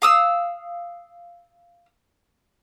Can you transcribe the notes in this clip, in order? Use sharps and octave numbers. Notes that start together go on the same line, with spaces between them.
F5 D#6 E6